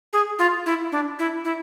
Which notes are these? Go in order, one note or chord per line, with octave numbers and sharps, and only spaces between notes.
G#4
F4
E4
D4
E4
E4